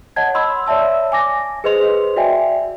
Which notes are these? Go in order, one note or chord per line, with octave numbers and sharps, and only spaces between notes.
C#5 D#5 F#5 A5 G#6
B5 C6 E6
C#5 D5 E5 A5 E6
G#5 D6 A#6
G#4 B4 C5 D#5 C6 F7
F#4 D5 E5 G5 G#5